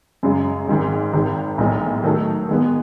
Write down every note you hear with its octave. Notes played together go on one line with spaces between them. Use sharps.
F#2 C#3 G#3
G#1 G#2 D#3 G#3
G#1 G#2 D#3
B1 A2 E3 G#3 D#4
D#3 F#3 A3 D#4 A4
D#3 G#3 B3